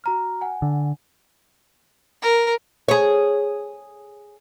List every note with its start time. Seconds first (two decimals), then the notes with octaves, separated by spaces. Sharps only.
0.04 F#4 A#5 F6
0.41 F#5 G#5
0.62 D3
2.22 A#4
2.88 G#4 C#5